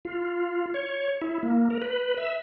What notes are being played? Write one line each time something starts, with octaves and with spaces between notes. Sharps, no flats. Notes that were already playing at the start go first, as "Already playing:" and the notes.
F4
C#5
E4
A#3
A#4
B4
E5